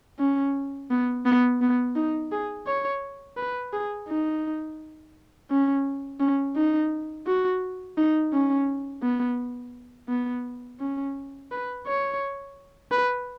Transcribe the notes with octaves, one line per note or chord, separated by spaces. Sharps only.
C#4
B3
B3
B3
D#4
G#4
C#5
B4
G#4
D#4
C#4
C#4
D#4
F#4
D#4
C#4
B3
B3
C#4
B4
C#5
B4